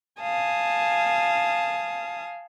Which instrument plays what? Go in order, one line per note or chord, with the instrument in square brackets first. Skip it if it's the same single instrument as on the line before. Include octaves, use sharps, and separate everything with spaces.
[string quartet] F5 G#5 A5 D#6